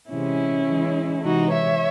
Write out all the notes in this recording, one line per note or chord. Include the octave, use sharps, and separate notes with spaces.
C3 E3 G#3 C#4 E4
C#3 E3 G#3
C3 E3 G#3 D#4 F#4
C#5 E5